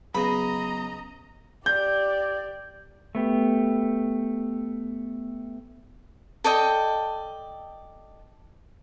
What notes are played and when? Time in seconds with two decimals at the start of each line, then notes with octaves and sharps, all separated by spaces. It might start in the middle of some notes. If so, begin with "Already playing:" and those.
0.15 C#3 F#3 B3 D#5 A#5 B5
1.66 G4 D5 G6
3.15 A3 B3 G4
6.44 A4 D5 D#5 G5